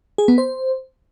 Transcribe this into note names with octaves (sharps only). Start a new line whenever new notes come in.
G#4
B3
C5